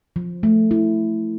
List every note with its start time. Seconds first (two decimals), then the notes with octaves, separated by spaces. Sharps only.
0.16 F3
0.43 A3
0.71 E4